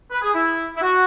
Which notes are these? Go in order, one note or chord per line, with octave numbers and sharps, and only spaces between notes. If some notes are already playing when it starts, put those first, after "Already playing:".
B4
G#4
E4
E4
F#4